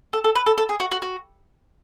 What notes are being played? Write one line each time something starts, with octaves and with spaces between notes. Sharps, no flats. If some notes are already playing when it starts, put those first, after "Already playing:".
A4
A4
B4
A4
A4
G#4
F#4
F#4
F#4